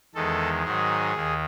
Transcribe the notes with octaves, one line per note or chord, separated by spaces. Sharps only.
E2 D#3 G#3 A4
G#2 D#3 F#3 G#4
D#2 D#3